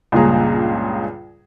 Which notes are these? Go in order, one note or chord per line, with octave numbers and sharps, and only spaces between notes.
C#2 G2 A#2 C#3 G#4 A#5